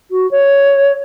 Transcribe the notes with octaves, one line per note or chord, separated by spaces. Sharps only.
F#4
C#5